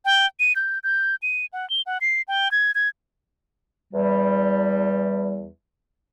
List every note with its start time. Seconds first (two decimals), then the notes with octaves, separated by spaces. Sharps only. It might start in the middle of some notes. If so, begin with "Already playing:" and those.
0.05 G5
0.40 D#7
0.56 G6
0.84 G6
1.22 D#7
1.53 F#5
1.70 G7
1.86 F#5
2.01 C7
2.28 G5
2.51 G#6
2.75 G#6
3.93 E2 G3